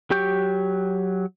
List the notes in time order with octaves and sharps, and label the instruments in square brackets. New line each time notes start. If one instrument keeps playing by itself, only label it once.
[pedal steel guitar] F#3 G4 G5 C#6 G6